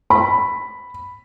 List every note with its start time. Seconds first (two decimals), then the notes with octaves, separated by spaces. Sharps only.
0.10 B5